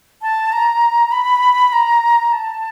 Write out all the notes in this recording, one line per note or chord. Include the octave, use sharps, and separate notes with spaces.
A5
A#5
B5
A#5
A5